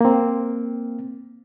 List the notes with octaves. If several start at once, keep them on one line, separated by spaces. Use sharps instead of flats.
A#3 C4